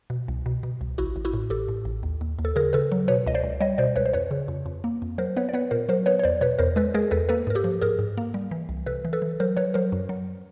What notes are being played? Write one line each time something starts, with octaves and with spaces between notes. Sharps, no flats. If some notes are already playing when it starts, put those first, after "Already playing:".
B2
C2
B2
B2
C2
A1 E4 F#4
A1
E4 F#4
A2
A1 G4 A4
A2
A1
D#2
D#2
D#2
A4
C#3 G#4 A#4
C#3 A4 B4
F#3
B2 B4 C#5
C#2 D#5
C5 D5
C#2
G3 C#5 D#5
B2 C5 D5
C#2 B4 C#5
C5
F2 B4 C#5
C#3
F2
F2
A#3
F2
F#3 A#4 C5
B3 B4 C#5
D5
B3 B4 C#5
A#2 A#4 C5
F#3 A#4 C5
B3 B4 C#5
C#5
E2 C5 D5
B2 B4 C#5
E2 A#4 C5
G#3 A4 B4
G#3 G#4 A#4
E2 A4 B4
A#3 A4 B4
G#2 A#4
G4 A4
F3
G#2 G#4 A#4
G#2
A#3
G3
E3
C2
C3 A4 B4
E3
A4 B4
E3
F#3 A#4 C5
F#3 B4 C#5
F#3 A#4 C5
F#2
F#3